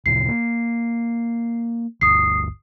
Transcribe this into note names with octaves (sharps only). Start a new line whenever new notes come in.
D2 A#2 C#3 C7
A#3
G1 D2 D#6 C7